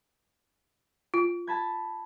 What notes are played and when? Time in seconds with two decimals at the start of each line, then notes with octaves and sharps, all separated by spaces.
1.14 F4
1.47 A5 B5 G#6